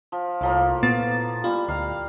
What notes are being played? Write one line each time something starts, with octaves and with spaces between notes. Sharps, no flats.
F3
C2 A2 F3 A#3
A#2 B3 A6
G3 F4
D2 F5 A#5